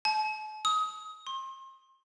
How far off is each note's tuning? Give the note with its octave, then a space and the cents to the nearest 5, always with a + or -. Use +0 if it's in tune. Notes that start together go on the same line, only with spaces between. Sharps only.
A5 -45
D#6 +25
C6 +35